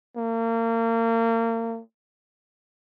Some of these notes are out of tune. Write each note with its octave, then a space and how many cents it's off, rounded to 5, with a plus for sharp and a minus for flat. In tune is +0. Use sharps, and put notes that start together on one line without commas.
A#3 -35